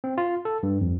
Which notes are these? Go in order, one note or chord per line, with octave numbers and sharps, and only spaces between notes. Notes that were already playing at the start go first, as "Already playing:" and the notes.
C4
F4
A4
G2
F2